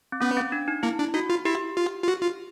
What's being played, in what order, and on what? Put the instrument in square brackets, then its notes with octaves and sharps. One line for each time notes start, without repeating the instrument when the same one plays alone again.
[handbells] C4
[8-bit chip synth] B3 [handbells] C#4
[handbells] C4
D4
D#4
[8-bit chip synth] A#3 [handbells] E4
[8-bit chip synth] D4
[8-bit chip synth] D#4 [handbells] F#4
[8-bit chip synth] F4
[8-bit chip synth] E4 [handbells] G4
[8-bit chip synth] F4
F4
F#4
F4